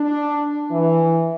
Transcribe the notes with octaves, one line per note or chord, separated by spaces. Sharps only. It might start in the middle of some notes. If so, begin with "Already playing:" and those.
Already playing: D4
E3